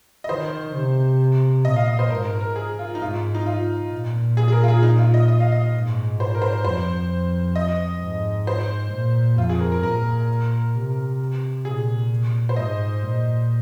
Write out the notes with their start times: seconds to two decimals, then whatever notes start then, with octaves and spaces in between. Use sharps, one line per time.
0.24 D#5
0.29 D#3 C5
0.75 C3
1.65 A#2 D#5
1.76 F5
1.88 D#5
1.99 C5
2.10 G#2 A#4
2.25 A#4
2.41 A#4
2.56 G#4
2.79 F4
2.95 D#4
3.01 G#2 F4
3.35 D#4
3.46 F4
3.92 A#2
4.37 G#4
4.48 G#4
4.52 A#4
4.63 F4
4.68 G#4
4.83 D#4
4.99 F4
5.14 D#5
5.28 D#5
5.40 F5
5.52 D#5
5.74 G#2
6.20 C5
6.35 A#4
6.42 C5
6.65 F2 C5
7.56 D#5
8.01 G#2
8.47 C5
8.93 A#2
9.37 F2 F4
9.49 G#4
9.60 A#4
9.72 A#4
9.83 A#2 A#4
10.75 C3
11.64 A#2 G#4
12.49 C5
12.55 G#2 D#5
13.02 A#2